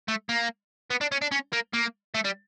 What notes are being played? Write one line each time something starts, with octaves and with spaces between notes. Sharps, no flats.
A3
A#3
B3
D4
C#4
D4
C#4
A#3
A#3
A3
G3